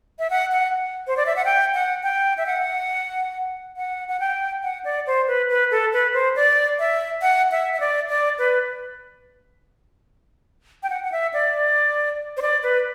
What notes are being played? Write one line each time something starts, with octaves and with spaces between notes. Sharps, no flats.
E5
F#5
F#5
C5
D5
E5
F#5
G5
F#5
G5
E5
F#5
F#5
F#5
G5
F#5
D5
C5
B4
B4
A4
B4
C5
D5
E5
F#5
E5
E5
D5
D5
B4
G5
F#5
F#5
E5
D5
C5
D5
B4